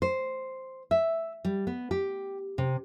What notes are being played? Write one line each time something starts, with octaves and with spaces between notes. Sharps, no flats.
C5
E5
G3
B3
G4
C3